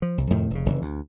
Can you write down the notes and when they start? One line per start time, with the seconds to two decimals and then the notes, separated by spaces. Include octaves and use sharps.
0.02 F3
0.18 C2
0.30 F2 A2 C3 D#3
0.51 F1 C#3
0.66 F1 C#3 E3
0.82 D2